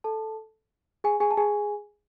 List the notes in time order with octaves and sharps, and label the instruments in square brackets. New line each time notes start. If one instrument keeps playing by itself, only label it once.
[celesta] A4 A5
G#4 G#5
G#4 G#5
A5
G#4 G#5